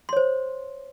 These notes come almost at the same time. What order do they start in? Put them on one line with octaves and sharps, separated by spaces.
C6 C#5 C5